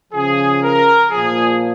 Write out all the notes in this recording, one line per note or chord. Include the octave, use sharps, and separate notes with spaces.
C#3 F3 G#4
A#4
A#2 F3 G#4